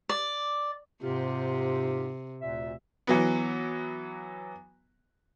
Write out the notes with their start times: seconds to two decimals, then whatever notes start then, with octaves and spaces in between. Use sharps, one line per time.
0.09 D5
1.03 G#2 C3 F4 G4
2.41 D2 A#2 E5
3.07 E3 F#3 B3